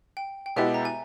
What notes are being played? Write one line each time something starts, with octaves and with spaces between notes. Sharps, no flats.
G5
G5
B2 G#3 B3 E4 G4 E5
A#5
G#5